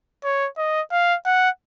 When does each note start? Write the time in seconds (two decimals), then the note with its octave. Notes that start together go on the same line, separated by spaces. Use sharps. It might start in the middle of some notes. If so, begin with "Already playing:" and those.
0.24 C#5
0.57 D#5
0.91 F5
1.26 F#5